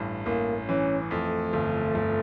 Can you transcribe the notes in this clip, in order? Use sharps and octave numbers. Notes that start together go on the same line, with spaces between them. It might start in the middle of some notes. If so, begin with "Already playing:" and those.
Already playing: A1 G2
A1 A#3
E3 C#4
F2 A3
G1
G1